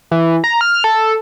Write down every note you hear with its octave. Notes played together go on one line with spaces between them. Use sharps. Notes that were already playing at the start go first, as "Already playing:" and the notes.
E3
A#5
F6
A4